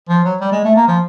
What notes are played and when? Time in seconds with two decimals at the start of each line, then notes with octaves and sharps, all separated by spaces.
0.09 F3
0.24 F#3
0.41 G3
0.52 G#3
0.65 A3
0.76 A#3
0.88 F3